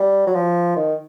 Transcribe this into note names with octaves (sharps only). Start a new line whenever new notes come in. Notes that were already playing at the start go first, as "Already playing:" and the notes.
Already playing: G3
F#3
F3
D#3